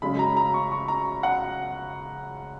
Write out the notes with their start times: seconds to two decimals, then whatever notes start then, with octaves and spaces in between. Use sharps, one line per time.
0.02 F#2 C#3 G#3 C#4 B5
0.19 A#5
0.37 A#5
0.54 C#6
0.72 C#6
0.88 A#5
1.23 F#5